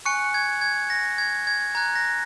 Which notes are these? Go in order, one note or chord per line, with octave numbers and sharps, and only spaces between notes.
G#5 C#6 F#6 C#7
G#6
G#6
A#6
G#6
G#6
A#5 F#6 G#6
A#6